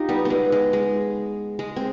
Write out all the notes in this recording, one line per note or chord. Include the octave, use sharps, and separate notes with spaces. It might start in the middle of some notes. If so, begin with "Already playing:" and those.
Already playing: D#4 F4 G4
G3 B3
G#3 B3
G#3
G#3
G#3
C4